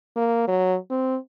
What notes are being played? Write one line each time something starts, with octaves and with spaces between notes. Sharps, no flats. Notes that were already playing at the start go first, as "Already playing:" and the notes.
A#3
F#3
C4